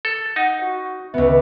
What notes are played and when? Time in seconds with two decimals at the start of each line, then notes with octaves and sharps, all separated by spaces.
0.05 A4
0.36 D#4 F#5
0.61 F#4
1.14 C#2 B3 E5